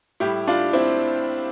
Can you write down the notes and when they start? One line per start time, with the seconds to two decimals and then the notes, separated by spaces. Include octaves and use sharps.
0.20 A2 G3 E4 G4
0.47 D4 F4
0.73 C4 E4